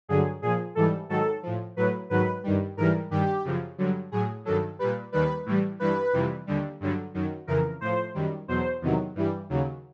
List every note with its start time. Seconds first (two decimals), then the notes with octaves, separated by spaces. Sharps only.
0.08 G2 D3 F#3 G#4
0.42 A#2 F3 G#4
0.75 G#2 E3 G3 A4
1.09 G#2 D#3 F#3 A4
1.43 A2 F3
1.77 A2 F#3 B4
2.10 G#2 D#3 F#3 B4
2.44 G2 D#3 G3
2.77 G#2 E3 G3 A#4
3.11 G2 D#3 G3 G4
3.44 F#2 C#3 F3
3.78 G2 D3 F#3
4.12 A2 F#3 G#4
4.45 G2 D#3 F#3 A4
4.79 A#2 G3 B4
5.12 D#2 D#3 G3 B4
5.46 A2 E3 G3
5.79 G2 E3 G3 B4
6.13 F2 C3 E3 G3
6.47 D#2 D3 G3
6.80 G2 D3 F#3
7.14 F#2 D#3 F#3
7.47 F2 C#3 E3 A#4
7.81 A2 F3 C5
8.14 F#2 D#3 G3
8.48 E2 B2 F#3 C5
8.82 E2 C3 D#3 F#3
9.15 G2 E3 G3
9.49 D#2 C#3 F#3